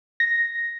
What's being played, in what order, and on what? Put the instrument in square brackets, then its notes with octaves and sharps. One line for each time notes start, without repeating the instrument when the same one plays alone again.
[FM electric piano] A#6